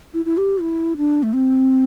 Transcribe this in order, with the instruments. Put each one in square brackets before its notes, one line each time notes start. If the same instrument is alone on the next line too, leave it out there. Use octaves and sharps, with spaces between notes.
[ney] E4
E4
G4
E4
D4
A3
C4